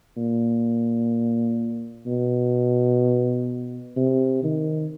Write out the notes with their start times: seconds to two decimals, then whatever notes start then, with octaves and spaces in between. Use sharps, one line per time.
0.17 A#2
2.06 B2
3.97 C3
4.43 D#3